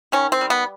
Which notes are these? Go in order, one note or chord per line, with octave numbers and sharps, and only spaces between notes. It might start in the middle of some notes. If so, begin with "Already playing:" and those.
D#3 C#4
C4
G3
B3